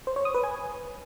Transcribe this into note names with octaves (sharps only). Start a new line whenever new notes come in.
C5
C#5
D#6
B4
G#5